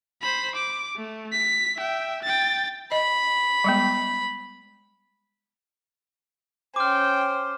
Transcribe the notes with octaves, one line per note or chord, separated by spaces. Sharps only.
C5 B5
D6
A3
B6
E5 G5
G5 A6
D#5 B5
G3 G#3 B3
C#4 C5 G5 D6 F6